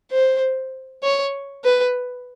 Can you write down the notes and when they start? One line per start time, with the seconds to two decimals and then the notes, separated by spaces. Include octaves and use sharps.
0.12 C5
1.03 C#5
1.65 B4